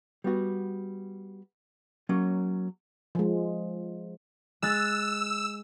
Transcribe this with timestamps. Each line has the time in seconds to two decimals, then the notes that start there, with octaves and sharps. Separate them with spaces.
0.24 G3 B3 F#4
2.09 F#3 A#3 C#4 C#5
3.15 F3 G#3
4.62 G#3 E6 F#6 A6